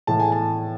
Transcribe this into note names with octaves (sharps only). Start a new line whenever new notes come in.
A2 E3 G#3 A5
G#5
A5